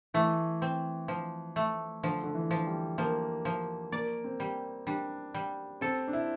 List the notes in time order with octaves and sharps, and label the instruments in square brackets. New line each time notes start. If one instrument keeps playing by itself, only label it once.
[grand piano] E3 [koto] A3
[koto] C4
F3
A3
[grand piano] D3 [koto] F3
[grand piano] D3
E3
[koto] F3
[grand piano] G3
[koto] F3 [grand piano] A#3
[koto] F3
[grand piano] A#3 [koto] D5
[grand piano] C4
[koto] G3
[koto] G3 [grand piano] D4
[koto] G3
[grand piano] C4 [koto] A4
[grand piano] D4
E4